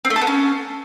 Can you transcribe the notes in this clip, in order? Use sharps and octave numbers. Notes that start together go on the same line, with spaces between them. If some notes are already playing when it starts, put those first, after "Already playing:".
C4
A3
A4
B3
C#4